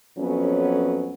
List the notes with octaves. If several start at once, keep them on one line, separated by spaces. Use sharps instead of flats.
F2 F#3 A3 B3 C#4